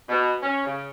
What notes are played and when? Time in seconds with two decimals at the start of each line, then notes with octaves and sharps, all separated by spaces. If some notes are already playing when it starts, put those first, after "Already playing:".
0.09 B2
0.43 C#4
0.65 C#3